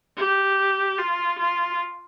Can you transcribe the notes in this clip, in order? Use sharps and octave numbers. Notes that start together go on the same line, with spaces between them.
G4
F4
F4